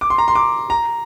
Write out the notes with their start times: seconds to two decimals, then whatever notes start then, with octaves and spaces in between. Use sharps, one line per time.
0.01 D6
0.10 C6
0.18 A#5
0.28 C6
0.35 D6
0.70 A#5